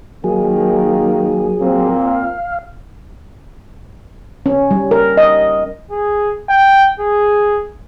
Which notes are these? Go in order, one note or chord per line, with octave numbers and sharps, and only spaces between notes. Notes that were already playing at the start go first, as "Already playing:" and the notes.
D#3 F#3 A#3 G#4
A#2 A#3 C4
F5
C#4
G3
A#4
D#5
G#4
G5
G#4